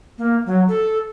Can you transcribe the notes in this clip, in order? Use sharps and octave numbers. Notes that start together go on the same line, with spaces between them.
A#3
F#3
A4